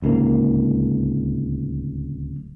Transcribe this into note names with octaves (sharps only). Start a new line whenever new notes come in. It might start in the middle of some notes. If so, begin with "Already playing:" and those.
D1 C#2 G#2 A#3